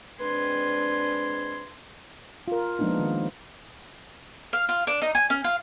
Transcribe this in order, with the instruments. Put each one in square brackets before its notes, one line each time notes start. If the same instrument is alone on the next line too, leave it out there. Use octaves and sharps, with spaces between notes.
[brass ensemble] G#3 C4 D4 [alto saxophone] B4 [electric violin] C6 G#6
[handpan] F4 A#4
F3 G#3 A#3 B3 D4 D#4
D#3
[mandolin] F5
F4
D4
D#4
G#5
C#4
F4